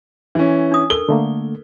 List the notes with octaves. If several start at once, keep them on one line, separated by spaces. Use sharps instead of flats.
E3 C#4
D4 D#6
A4 A#4 G7
D3 A3 A#3